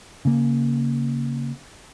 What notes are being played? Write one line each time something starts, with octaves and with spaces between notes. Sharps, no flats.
C#3 A#3